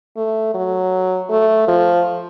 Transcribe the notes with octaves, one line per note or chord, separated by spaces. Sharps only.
A3
F#3
A3
F3